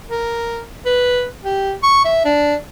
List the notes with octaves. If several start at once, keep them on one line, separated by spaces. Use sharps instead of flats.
A#4
B4
G4
C#6
E5
D4